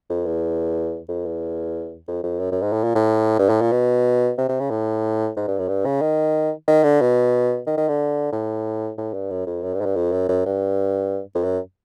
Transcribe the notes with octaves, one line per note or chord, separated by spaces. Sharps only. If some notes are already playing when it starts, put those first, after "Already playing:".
F2
E2
F2
E2
F2
F2
F#2
F#2
G#2
A2
A#2
A2
G2
A2
A#2
B2
C3
C3
C#3
A2
G#2
G2
F#2
G2
C#3
D#3
D#3
D3
B2
D#3
D#3
D3
A2
A2
G2
F#2
F2
F#2
G2
G#2
G2
F2
F#2
F#2
G2
F2
F#2